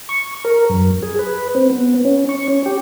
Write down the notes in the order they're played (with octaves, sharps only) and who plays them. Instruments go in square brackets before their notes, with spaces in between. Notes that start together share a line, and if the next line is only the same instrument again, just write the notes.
[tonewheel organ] C#6
A#4
F#2
G#4
B4
C4
B3
C#4
C#6
C#4
G4